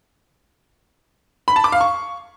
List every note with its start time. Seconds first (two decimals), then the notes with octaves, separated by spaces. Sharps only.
1.48 B5
1.56 A5
1.64 D6
1.72 F5
1.81 C#6